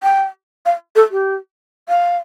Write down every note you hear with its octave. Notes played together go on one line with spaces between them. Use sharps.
G5
F5
A4
G4
F5